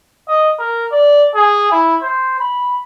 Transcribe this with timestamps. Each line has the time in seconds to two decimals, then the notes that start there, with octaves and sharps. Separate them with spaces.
0.28 D#5
0.59 A#4
0.92 D5
1.35 G#4
1.71 E4
2.03 C5
2.40 B5